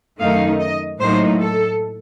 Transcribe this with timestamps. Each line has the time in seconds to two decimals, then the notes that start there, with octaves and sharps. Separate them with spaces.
0.21 F#2 D#3 A3 D#4 F5
0.61 D#5
1.00 A2 F#3 A#3 D#4 C5
1.40 A4